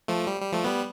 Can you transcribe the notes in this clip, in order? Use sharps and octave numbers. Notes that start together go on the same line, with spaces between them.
F3 A3
G3
G3
F3 A3
G3 B3